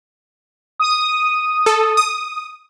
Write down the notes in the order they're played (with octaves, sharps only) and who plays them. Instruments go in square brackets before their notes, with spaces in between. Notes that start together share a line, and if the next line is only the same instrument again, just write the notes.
[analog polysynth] D#6
[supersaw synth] A4
D#6